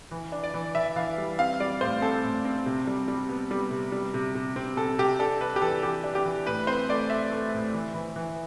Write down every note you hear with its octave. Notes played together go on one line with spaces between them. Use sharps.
E3
D4
D5
E3
E3 E5
E3 F5
G3
C4 F5
G3 D5
A2 C5
C4 A4
A2
C4
C3
G3
G3
B3
G3
C3
G3
C3
C3
C4
C3 A4
C3 G4
D4 A4
D4 B4
G4
E3 A4
E3 G4
D4
G4
E3
A2 B4
C4 C5
A3 D5
A3 E5
A3
A2
E3
E3
E3